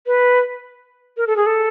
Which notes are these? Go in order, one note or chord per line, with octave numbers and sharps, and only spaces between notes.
B4
A#4
A4
G#4
A4